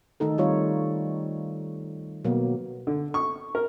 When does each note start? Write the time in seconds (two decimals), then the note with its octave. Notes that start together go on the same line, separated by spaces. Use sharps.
0.20 D#3 A3 D#4 A4
0.38 G3 C4 F4 C#5
2.25 B2 F#3 A#3 B3
2.87 D3
3.14 C#6
3.55 A#4